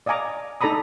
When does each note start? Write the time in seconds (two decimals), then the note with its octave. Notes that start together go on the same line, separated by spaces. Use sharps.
0.06 D5 D#5 F5 G#5 A#5 D6
0.61 D#4 A4 D5 A#5 B5 D#6